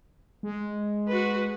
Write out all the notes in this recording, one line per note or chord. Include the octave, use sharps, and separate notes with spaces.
G#3
F#4 B4